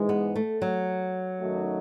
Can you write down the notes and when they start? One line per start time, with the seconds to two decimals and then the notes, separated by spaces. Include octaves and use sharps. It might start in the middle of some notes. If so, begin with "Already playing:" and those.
Already playing: G#2 E3 G#3
0.09 B3
0.35 A3
0.62 F#3
1.41 F#2 D#3 A3 D#4 F#4